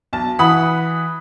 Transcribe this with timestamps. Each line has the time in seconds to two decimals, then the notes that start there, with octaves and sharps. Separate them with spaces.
0.13 B1 A5
0.39 E3 F#5 B5 D#6